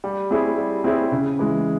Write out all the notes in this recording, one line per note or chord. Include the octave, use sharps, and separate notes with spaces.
G3
C4 E4 G#4 C#5
G3
C4 E4 G#4 C#5
C#3
E3 G#3